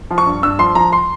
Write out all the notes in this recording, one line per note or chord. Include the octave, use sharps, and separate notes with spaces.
F3
C#6
G2
G2 E6
F3 C6
F3 A#5
C6